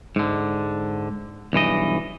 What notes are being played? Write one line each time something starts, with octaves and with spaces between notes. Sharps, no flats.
G#2 D3
B1 G2 E3 D#5